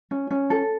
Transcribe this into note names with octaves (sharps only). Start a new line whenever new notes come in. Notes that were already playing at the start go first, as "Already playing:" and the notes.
C#4
C#4
A4